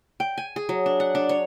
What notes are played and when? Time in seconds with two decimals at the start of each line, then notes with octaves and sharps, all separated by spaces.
0.20 G5
0.38 G#5
0.56 G#4
0.69 F#3
0.86 D4
1.00 F#5
1.15 D4
1.29 C#5